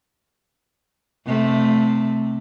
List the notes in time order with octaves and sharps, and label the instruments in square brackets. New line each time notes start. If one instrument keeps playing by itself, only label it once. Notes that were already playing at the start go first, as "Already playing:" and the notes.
[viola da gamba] C3 A3